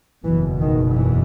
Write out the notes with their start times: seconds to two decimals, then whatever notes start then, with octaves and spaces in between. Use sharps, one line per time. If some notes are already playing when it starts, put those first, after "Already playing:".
0.24 F#1 E2 B2 E3
0.59 D#3
0.95 E3